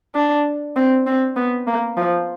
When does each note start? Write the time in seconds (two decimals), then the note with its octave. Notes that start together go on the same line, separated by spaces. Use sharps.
0.15 D4
0.76 C4
1.07 C4
1.36 B3
1.67 A#3
1.97 F3